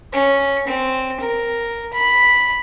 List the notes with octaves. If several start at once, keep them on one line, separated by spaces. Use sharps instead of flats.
C#4
C4
A#4
B5